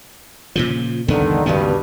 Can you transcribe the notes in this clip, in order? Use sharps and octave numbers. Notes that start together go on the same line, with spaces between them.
A#2 C#3 F3
C2 F2 D3 D#3 B3
C#2 G2 B2 D#3 B3